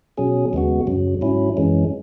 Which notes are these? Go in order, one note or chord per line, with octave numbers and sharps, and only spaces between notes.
B2 F#3 C#4 G#4
D#2 C#3 G#3 B3 F#4
F#2 C#3 F#3
G#2 F#3 C#4 E4
F#2 E3 G#3 C#4